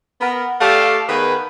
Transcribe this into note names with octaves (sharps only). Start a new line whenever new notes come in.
B3 A#4
A3 G4 A4 D5 F5 A5
D#3 B3 G#4 B4